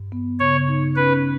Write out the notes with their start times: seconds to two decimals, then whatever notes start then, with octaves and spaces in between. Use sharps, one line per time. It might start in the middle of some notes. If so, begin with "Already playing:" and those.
Already playing: G2
0.12 B3
0.40 C#3 C#5
0.68 D#4
0.96 C#4 B4